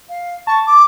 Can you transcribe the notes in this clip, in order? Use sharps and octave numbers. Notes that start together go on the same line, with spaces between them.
F5
A5 C#6
D6